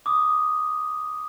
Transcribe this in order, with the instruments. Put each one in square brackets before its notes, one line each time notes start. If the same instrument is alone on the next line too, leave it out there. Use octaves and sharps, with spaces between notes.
[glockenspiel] D6 D#6